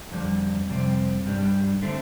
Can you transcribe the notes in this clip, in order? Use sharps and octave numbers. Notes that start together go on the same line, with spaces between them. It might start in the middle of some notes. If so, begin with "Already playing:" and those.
F2 D3 G3
F2 C3 G3 C4
G2 G3 D4
D3 A3 C4